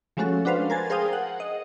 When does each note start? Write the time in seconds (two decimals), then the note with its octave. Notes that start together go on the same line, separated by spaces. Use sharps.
0.17 F3 G#3 A3 C#4 F#4 A4
0.45 D4 F#4 B4 C5 F5
0.70 A#4 C5 G#5 G#6 A6
0.90 G#4 A#4 C5 F5 G5 D#6
1.13 F#5
1.40 D#5